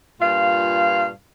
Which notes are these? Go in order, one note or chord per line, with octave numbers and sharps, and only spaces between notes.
G2 A#2 F4 F5